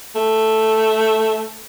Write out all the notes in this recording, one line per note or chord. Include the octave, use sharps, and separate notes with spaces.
A3